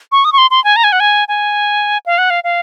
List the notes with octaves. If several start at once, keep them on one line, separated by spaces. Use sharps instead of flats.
C#6
D#6
C#6
C6
C6
G#5
A#5
G#5
F#5
G#5
G#5
F5
F#5
F5
F5